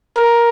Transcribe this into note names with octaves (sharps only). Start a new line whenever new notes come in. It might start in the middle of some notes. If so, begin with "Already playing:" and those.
A#4